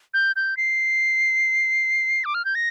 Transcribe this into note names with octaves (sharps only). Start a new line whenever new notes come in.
G6
G6
C7
D6
F6
G6
A#6